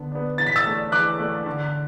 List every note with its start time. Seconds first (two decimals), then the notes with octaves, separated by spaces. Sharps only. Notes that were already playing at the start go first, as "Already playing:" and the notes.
Already playing: D3 B3 D4
0.12 B3 D4
0.38 E3 A6
0.46 B6
0.56 E6 A6
0.66 A3 D4
0.92 E3 D6 F#6
1.19 A3 D4
1.46 D3